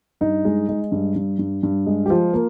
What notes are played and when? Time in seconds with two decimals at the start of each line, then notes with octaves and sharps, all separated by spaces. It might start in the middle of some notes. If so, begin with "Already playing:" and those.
0.21 G2 D#4
0.45 G#3
0.69 G#3
0.92 G2
1.16 G2
1.39 G2
1.63 G2
1.86 G#3
2.06 G4
2.10 F3 F4
2.33 A#3